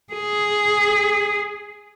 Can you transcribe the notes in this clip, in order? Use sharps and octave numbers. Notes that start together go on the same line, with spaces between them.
G#4